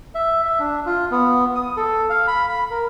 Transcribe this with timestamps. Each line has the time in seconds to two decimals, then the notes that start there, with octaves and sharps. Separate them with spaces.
0.15 E5
0.45 E5
0.60 D4
0.86 F4
1.11 B3
1.55 D#6
1.77 A4
2.10 F5
2.27 B5
2.49 B5
2.71 A#4